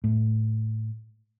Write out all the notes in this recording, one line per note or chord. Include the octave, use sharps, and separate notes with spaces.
A2